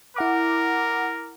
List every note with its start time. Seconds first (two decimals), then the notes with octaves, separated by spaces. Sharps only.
0.16 E4 A#4 F#5 D6